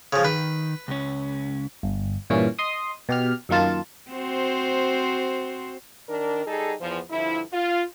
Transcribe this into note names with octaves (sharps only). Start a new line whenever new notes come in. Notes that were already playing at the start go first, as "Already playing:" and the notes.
C#3 F3
D#3 B4
C#2 C#4
G1
G2 A#2 E3 C#4
D#5 C6 D#6
B2 G4 F6
F#2 D#3 A#3 F4 A5
C4 F#4 C5
D#3 D4 A#4
G3 D#4 G#4 A4
E2 F3
G2 D3 F3 E4
F4